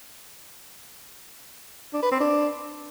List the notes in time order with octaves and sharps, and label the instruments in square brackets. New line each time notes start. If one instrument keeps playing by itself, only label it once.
[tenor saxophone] D4
B4
C4
D4